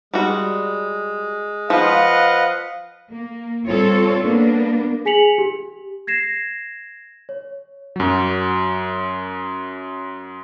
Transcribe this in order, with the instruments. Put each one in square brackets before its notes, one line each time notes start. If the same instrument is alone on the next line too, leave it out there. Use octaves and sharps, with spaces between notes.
[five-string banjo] G3 F#4 [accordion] G#3
[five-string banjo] F3 [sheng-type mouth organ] B4 D#5 F#5 [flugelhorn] F5
[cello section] A#3
G3 C4 F4 A4 C#5
A#3 B3 D4
[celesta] G#4 G#5 B6 C#7 F7 F#7
G4
G#6 A#6 C7 E7
C#5
[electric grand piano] F#2 F#3